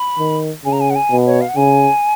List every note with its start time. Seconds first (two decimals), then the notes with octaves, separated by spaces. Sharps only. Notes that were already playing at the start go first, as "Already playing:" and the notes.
Already playing: B5
0.19 D#3
0.65 C#3 G#5
0.72 A#5
0.80 G#5
0.90 F#5
0.95 G#5
1.11 B2
1.26 C#5
1.41 F5
1.49 F#5
1.56 C#3 G#5